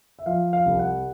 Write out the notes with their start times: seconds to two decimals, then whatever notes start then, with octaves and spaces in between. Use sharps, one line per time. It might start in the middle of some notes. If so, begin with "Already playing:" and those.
0.19 E5
0.26 F3 F5
0.53 F5
0.66 C2
0.79 F#5